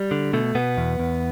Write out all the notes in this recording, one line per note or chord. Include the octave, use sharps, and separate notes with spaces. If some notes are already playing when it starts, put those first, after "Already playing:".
Already playing: G3
D3
B2 A3
B2 B3
E2
E2